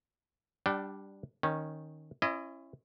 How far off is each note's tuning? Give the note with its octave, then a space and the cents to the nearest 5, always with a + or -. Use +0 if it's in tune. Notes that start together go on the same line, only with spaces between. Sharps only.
G3 +0 D4 +0 G5 -40
D#3 +0 C#4 -15
C#4 -25 E4 +25 D#5 -15